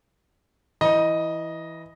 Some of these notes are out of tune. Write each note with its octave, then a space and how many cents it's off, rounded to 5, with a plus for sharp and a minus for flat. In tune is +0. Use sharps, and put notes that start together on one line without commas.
E3 +0 D#5 +0 A#5 +45